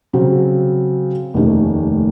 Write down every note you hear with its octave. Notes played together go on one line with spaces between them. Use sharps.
C#3 F#3 C4
F1 D#2 D#3 A3 C#4